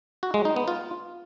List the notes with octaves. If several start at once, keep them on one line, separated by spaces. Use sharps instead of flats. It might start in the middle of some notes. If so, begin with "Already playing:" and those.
F#4
G#3
D#4
B3
F4